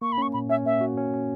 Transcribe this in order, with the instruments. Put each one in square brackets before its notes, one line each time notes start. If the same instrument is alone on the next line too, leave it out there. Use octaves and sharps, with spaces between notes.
[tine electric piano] A#3 [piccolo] C#6
[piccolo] B5
[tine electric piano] C#4 [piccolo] C#6
[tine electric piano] A#2 [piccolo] B5
[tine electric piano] C#4 [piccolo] E5
[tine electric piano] A#3 [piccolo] E5
[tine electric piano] F#4
C#4
C#4